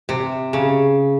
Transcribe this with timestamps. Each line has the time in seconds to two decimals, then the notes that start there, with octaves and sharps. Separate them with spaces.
0.09 C3
0.53 C#3